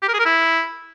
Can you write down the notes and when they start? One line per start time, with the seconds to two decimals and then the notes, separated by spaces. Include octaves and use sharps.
0.02 G4
0.08 A#4
0.14 G#4
0.20 A#4
0.25 E4